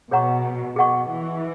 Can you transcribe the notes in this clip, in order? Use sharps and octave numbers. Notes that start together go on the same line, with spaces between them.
B2 G#4 C#5 F#5 A#5 C#6
B2 G#4 D#5 F#5 C#6
E3